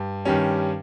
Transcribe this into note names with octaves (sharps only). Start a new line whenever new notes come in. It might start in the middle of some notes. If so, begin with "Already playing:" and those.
Already playing: G2
G2 D#3 G3 C#4